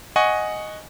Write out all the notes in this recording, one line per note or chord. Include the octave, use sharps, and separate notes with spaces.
D#5 F#5 G#5 C#6